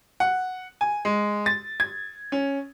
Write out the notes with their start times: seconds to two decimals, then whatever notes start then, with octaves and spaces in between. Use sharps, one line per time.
0.20 F#5
0.81 G#5
1.05 G#3
1.46 A6
1.80 G#6
2.32 C#4